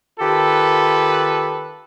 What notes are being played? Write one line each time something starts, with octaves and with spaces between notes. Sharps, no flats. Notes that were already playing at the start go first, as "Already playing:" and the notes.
D#3 F4 G4 A4 B4